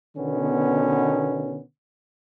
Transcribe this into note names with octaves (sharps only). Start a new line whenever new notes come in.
B2 D3 D#3 B3 C#4